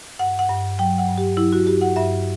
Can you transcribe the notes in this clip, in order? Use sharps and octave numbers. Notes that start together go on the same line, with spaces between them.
G2 F#5
F#5
G2
F#3 G5
F#5
G2
G4
F#3 E4
F#4
G2 G4
F#5
G2 E5